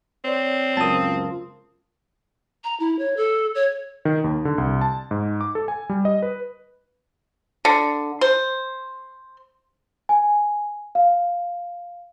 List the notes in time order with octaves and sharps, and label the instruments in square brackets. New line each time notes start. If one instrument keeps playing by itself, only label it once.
[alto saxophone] C4 [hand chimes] C#5 D5
[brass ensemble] C#2 F#2 F4 [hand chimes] B3 A#4 [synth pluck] A5 D#6
[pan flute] A#5
E4
C#5
A4
C#5
[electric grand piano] D#3
D#2
D3
C2
A5
G#2
D6
A4
G#5
G3
D#5
B4
[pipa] D3
C5
[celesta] G#5
F5